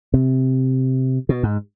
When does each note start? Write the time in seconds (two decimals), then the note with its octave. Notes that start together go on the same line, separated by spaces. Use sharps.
0.14 C3
1.29 B2
1.43 G#2